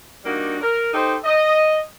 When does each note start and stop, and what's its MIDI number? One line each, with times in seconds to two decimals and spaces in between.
0.24 0.55 55
0.24 0.55 58
0.24 0.55 62
0.24 0.55 63
0.24 0.55 66
0.61 0.91 70
0.93 1.15 63
0.93 1.15 67
0.93 1.15 69
0.93 1.15 72
1.24 1.78 75